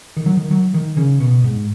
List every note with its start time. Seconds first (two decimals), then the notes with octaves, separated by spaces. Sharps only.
0.17 D#3
0.26 F#3
0.37 D#3
0.51 F#3
0.74 D#3
0.97 C#3
1.20 B2
1.44 G#2